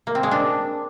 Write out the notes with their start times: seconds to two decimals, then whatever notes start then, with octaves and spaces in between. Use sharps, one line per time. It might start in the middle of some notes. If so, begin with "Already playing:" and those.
0.07 A#3
0.15 C4
0.23 G#3
0.31 D4